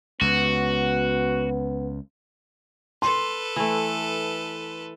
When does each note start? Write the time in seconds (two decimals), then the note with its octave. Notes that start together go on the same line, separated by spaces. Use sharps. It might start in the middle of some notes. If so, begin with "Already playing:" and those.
0.21 C#2 B3 F#4
3.02 A4 B4 C6
3.56 E3 A3